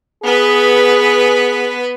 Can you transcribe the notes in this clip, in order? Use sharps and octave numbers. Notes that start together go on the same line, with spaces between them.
B3 G#4 B4